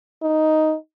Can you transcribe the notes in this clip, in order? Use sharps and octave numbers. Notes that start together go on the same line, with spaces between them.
D#4